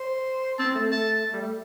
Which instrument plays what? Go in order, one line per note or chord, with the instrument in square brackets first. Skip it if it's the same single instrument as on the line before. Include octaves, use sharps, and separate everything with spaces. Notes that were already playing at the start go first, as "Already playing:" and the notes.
Already playing: [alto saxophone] C5
[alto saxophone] C4 [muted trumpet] A5
[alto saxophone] A3
[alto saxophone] A3 [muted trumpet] A5
[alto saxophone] A3
G3
A3